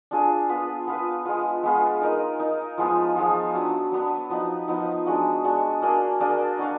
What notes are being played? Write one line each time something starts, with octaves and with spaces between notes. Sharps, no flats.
D4 F4 G#4 D5
B3 F4 B4
B3 F4 B4
G#3 B3 F4
G#3 B3 F4
D#4 A#4 D#5
D#4 A#4 D#5
F3 G#3 B3 F4
F3 G#3 B3 F4
F#3 B3 D4
F#3 B3 D4
F3 B3 D#4
F3 B3 D#4
G#3 D4 F#4
G#3 D4 F#4
A#3 D4 G#4 D5
A#3 D4 G#4 D5
D4 F#4 D5 F5